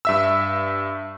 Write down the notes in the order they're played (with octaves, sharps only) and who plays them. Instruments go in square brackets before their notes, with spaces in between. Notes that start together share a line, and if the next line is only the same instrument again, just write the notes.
[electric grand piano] G2 E5 E6